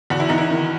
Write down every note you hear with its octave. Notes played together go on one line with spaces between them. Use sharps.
E2 F#4
E4
E2 D#4
E4
D#3